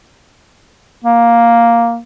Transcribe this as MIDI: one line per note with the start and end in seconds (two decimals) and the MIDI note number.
1.04 1.99 58